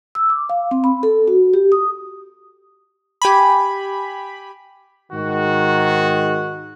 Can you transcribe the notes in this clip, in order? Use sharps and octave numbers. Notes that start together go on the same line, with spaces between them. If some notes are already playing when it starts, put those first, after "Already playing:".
E6
D6
F5
C4
B5
A4
F#4
G4
D#6
G4 G#5 B5
G#2 D#3 F#4